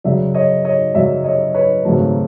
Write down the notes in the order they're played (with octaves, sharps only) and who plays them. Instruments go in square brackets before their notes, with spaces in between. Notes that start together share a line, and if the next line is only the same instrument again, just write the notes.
[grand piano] F#2 C#3 F#3 D5 E5
C#5 D#5
C#5 D#5
F#2 C#3 F#3 D5 E5
C#5 D#5
B4 C#5
G#1 F#2 C#3 F#3 A3